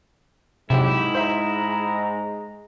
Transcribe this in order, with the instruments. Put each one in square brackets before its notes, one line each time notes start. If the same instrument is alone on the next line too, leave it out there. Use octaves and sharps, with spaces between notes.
[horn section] G#2 G#3 [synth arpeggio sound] C3 F#3 [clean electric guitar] E4 [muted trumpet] G4
[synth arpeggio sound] C5 E5 [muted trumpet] A#5